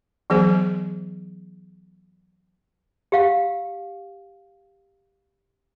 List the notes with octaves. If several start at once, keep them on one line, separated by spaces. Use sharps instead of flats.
E3 F#3 B3 G#4 C5
G4 F5 F#5